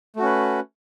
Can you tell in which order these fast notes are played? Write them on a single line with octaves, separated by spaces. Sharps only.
A3 F#4 C#4 B4